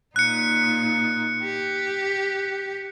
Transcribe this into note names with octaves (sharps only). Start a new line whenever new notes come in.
A#2 D#4 F#6 C#7
G4